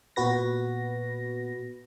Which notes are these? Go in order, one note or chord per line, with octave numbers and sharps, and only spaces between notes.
A#2 B3 F#4 B4 A#6